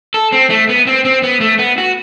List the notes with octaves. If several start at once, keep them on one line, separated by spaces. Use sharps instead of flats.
A4
C4
A3
B3
C4
C4
B3
A3
B3
F#4